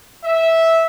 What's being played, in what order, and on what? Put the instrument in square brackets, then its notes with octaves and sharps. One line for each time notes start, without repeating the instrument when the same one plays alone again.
[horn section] E5